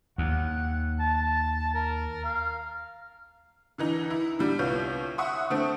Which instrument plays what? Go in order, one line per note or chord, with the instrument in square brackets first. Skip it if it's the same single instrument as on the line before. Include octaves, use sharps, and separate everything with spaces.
[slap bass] D#2 [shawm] F#5
[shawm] A5
A#4
F5
[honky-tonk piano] D3 E3 D#4
E4
D3 G3
C2 B3 F4 C#5 G6
E5 F#5 C#6 D#6 E6
D3 A3 C4